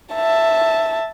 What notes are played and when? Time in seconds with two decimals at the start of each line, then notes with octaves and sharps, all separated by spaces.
0.15 E5 A5